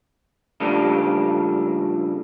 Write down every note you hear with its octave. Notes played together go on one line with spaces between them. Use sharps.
C#3 F3 G3 A3 A#3 D4